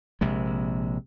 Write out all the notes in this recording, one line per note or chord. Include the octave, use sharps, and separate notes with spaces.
A#1 C3 G#3